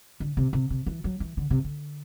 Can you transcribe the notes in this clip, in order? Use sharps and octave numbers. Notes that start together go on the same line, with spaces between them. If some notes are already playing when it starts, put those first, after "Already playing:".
D3
C3
C3
C3
E3
F#3
E3
D3
C3
D3